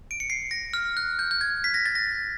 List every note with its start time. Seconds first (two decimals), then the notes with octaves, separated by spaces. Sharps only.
0.11 D7
0.20 C#7
0.30 C7
0.51 A#6
0.74 F6
0.97 F#6
1.19 G6
1.31 G6
1.41 G#6
1.64 B6
1.74 A#6
1.86 A6
1.95 A#6